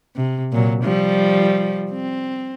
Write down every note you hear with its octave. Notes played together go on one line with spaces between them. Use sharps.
C3
A#2 F#3
F3 G3
C4